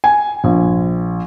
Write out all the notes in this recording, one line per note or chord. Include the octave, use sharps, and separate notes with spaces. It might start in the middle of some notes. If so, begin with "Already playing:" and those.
G#5
A#1